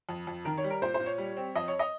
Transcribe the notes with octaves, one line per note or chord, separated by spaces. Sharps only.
F2
F2
D#3 A#4
C#5
G3
A#4
A#2 C5
C5
A#2
C#5
G3
C4
F2 D#5
C#5
D#5